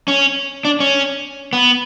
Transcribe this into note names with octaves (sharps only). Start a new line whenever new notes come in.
C#4
D4
C#4
B3